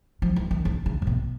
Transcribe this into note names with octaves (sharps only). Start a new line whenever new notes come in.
F3
E3
D#3
D3
C#3
C3
B2